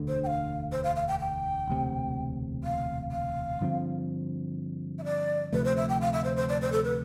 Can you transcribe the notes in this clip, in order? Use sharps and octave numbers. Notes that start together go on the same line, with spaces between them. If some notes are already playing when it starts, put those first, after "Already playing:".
Already playing: E1 D2 D3
C5
G5
F5
C5
F5
F5
G5
G5
E1 D2 C3
F5
F5
G2 D3 F3 C4
E5
D5
D2 C3 F3 A3 B4
C5
E5
G5
F5
E5
C5
C5
D5
C5
A4
B4